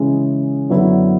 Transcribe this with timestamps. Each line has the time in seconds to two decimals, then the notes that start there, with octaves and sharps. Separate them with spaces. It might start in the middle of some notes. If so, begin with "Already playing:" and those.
Already playing: C#3 E3 G#3
0.70 F#2 D3 F#3 B3 E4